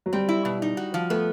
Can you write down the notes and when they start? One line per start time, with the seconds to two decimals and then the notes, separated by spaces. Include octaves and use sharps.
0.06 F#3
0.13 G3 C4
0.29 E4
0.45 B2
0.62 D#4
0.77 F#4
0.94 F3
1.10 A3 B3